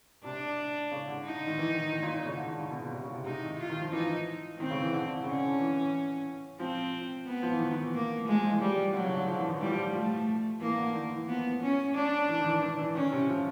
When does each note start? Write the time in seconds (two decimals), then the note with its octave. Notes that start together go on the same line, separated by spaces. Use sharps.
0.24 C3 D4
0.91 C#3
1.08 D3
1.25 D#4
1.47 D#3
1.58 E3
1.75 D#3
1.92 D#3
2.02 A#2
2.14 A#2
2.25 C#3
2.36 D3
2.48 D#3
2.58 C#3
2.70 B2
2.81 A#2
2.92 C3
3.03 C#3
3.14 C3
3.26 C3 D#4
3.42 D#3
3.59 F4
3.70 D#3
3.81 F3
3.93 E3 D#4
4.59 D#3 C4
4.70 C#3
4.81 E3
4.93 D3
5.15 D3
5.23 C#3 C#4
5.32 D3
5.60 E3
5.76 E3
6.59 F3 C4
7.27 B3
7.43 F3
7.52 E3
7.60 D#3
7.71 D#3
7.82 E3
7.94 A#3
8.27 F3 G#3
8.39 F3
8.49 E3
8.61 G3
8.94 D3 F#3
9.04 C#3
9.17 D3
9.27 F3
9.38 E3
9.49 D#3
9.60 E3 G3
9.72 F3
9.94 F3 A3
10.61 E3 A#3
10.78 D3
10.94 D#3
11.11 E3
11.28 F3 B3
11.62 C#4
11.95 D4
12.29 E3
12.41 D#3
12.45 E3
12.62 D#3
12.79 E3
12.95 D#3 C#4
13.12 C3
13.29 F3